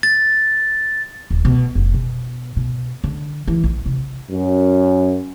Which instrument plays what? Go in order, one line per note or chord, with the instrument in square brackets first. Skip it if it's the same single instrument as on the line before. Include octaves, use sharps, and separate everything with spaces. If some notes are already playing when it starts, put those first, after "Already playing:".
[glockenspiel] A6
[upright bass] D#1
B2
F1
B2
B2
D3
E3
A#1
C3
[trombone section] F#2